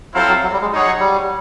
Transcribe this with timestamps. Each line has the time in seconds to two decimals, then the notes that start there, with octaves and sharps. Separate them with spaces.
0.14 F#3 C4 E4 A4 C5 F5
0.29 F#3
0.43 F#3
0.53 G3
0.62 G#3
0.72 D#4 G#4 C#5 F#5
0.86 F#3
1.00 G3